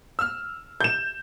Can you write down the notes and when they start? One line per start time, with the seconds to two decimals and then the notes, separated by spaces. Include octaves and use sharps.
0.19 E6 F6
0.81 G6 E7